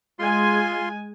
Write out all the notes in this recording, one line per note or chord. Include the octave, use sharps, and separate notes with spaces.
G#3 F4 G#5 C6